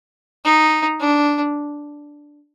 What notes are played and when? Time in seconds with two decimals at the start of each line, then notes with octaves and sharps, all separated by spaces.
0.45 D#4
1.00 D4